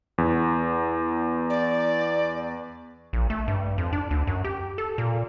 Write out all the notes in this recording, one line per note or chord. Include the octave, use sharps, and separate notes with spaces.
E2
D5
A#1
A3
G2
F2
D4
D2
F#2
G4
A4
A#2